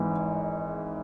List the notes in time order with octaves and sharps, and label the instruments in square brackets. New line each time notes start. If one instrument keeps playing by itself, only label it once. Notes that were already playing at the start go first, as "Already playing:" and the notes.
Already playing: [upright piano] G#1 G#2 E3